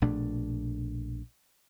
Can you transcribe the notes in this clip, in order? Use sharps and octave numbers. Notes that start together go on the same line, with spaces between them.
A#1 B2 A3 D4